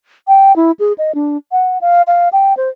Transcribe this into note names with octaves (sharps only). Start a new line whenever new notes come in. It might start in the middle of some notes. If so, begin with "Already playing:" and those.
G5
E4
G#4
D#5
D4
F#5
F5
F5
G5
C5